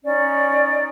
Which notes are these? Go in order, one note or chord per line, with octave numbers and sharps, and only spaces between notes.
C#4 D#4 D5